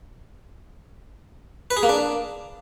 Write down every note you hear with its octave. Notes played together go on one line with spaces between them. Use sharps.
B4
G#4
A#3
D4